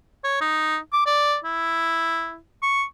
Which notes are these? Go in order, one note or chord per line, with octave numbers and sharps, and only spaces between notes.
C#5
D#4
D6
D5
E4
C#6